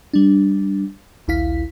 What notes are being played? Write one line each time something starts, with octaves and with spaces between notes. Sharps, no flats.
G3 D4
A#1 D#2 E4 F5 B6